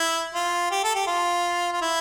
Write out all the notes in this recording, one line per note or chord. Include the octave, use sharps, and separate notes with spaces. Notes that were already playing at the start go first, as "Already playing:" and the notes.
Already playing: E4
F4
G4
A4
G4
F4
F4
E4